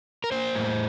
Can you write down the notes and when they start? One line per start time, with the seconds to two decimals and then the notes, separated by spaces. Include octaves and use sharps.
0.24 A#4
0.32 A#3 C5
0.55 A2